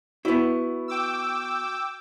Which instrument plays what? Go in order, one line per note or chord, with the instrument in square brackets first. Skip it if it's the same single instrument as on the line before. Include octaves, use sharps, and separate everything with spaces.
[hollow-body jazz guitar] B3 E4 [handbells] F#4
[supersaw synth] G5 D6 E6